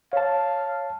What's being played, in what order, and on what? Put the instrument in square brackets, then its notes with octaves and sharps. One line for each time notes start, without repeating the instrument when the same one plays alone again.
[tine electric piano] C#5 A5 [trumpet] F5